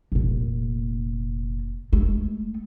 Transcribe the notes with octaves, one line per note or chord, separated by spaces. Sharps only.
F1 A#2
G#3 A3